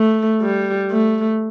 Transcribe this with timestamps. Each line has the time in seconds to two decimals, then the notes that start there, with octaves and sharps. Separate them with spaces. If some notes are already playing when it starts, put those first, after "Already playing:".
Already playing: A3
0.42 G3
0.91 A3